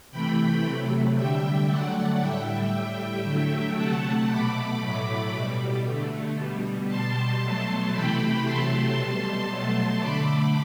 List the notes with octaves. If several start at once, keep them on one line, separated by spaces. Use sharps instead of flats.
C3 E3 A3 G5 B5
C3 F#3 A3
D3 G3 E5 G5
D3 F#3 A3 D5 F#5
A2 G3 E5 G5
A2 G3
D3 F#3 A3
C3 F#3 A3 F#5 A5
B2 A3 B5 D6
A2 F#3 A3 B5 D6
B2 G3
D3 A3
B2 G3
B2 G3 A5 C6
B2 F#3 A3
C3 E3 A3 G5 B5
C3 F#3 A3 A5 C6
B2 G3
B2 F#3 A3
D3 A3 B5 D6